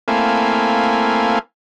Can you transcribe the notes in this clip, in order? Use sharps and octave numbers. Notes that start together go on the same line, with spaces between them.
A3 A#3 C4 E4 F5 G#5